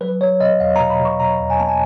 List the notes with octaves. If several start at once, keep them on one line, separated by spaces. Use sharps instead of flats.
F#3 B4
F#3 C#5
B2 D#5
E2 F5
A#5
B2
B5
B2
C#6
B2 A#5
E2
G#5
B3 A5
G#5